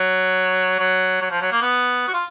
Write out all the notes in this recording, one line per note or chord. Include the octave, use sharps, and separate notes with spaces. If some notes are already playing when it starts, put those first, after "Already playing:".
Already playing: F#3
F#3
F#3
F3
F#3
A#3
B3
F#4
F4